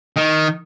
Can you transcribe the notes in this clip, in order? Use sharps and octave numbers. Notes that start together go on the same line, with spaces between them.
D#3